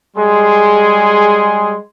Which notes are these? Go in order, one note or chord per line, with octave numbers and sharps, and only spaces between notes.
G3 G#3 G#4 C6